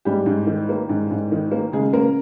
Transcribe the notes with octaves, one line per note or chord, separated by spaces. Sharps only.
G#2 G3 G4
G#2
D#3
A#3
G#2
G#2
D#3
A#3
C#3 G#3 G#4
C#3 A#3 A#4